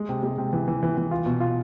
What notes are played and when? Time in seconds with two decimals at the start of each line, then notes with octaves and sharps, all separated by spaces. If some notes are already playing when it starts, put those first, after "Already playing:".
Already playing: G#3
0.09 C3
0.23 G#3
0.38 C3
0.53 E3
0.68 E3
0.83 E3
0.97 E3
1.11 F4
1.26 B2
1.40 F4